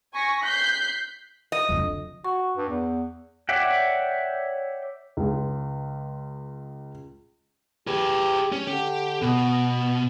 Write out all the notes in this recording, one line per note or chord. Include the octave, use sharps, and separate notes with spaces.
G#5 C#6 A#6 B6
F#6 G6 B6 C7
D#5
F2 D3
F#4 C#6
G2
E2
C#5 D5 E5 F#5 G5
C#2 G#3
G4 G#4 B4
C#4
D3 G4
B2 B3